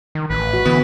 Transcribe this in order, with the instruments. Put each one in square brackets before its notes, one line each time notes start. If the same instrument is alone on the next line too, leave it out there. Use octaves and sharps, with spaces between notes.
[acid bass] D#3
[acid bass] A1 [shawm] B4
[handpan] F#4
[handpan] D3 [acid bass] E3 [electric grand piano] B3